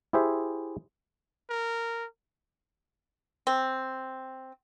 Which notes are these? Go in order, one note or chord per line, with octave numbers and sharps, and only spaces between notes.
E4 G4 G#4 C5 E5
A#4
C4